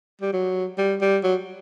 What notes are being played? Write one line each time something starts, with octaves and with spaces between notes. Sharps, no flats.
G3
F#3
G3
G3
F#3